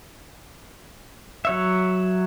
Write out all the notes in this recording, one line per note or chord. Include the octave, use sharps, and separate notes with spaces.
F#3 C#5 E5